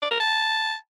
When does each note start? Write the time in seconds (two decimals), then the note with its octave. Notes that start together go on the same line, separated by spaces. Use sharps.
0.02 D5
0.11 A#4
0.20 A5